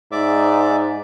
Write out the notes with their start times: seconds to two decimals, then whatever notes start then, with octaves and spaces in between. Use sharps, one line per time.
0.12 G#2 D5 E5 D6